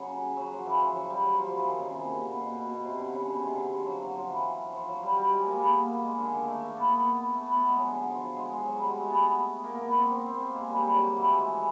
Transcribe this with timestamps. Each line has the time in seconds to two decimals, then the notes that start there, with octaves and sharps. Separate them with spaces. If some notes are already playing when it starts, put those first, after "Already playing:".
Already playing: C#3 F#3
0.37 F#3
0.52 F3
0.66 E3
0.81 F3
0.95 F#3
1.10 G3
1.24 F#3
1.36 F3
1.46 F3
1.57 E3
1.68 D#3
1.79 C#3
1.90 C3
2.01 B2
2.11 A#2
2.27 B2
2.41 B2
2.55 B2
2.70 B2
2.84 C3
2.99 D3
3.14 C#3
3.28 B2
3.42 C3
3.53 D3
3.75 F3
3.86 F#3
4.01 F#3
4.15 F3
4.30 E3
4.73 F3
4.88 F#3
5.03 G3
5.17 G3
5.32 G#3
5.46 A#3
5.60 B3
5.75 A#3
5.90 A#3
6.04 G#3
6.18 D3
6.33 D#3
6.48 A3
6.62 A#3
6.77 B3
6.91 B3
7.35 A3
7.46 B3
7.57 B3
7.68 G#3
7.78 F#3
7.89 D3
8.11 F3
8.37 G#3
8.51 G#3
8.66 F#3
8.77 G3
8.88 G#3
8.99 A3
9.10 B3
9.64 A#3
9.75 A#3
9.86 B3
9.97 C4
10.11 C4
10.26 C4
10.40 A#3
10.55 G#3
10.69 G3
10.83 G3
10.94 F#3
11.17 E3
11.27 A3
11.38 G#3